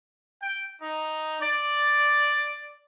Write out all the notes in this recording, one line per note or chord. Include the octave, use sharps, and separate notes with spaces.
G5
D#4
D5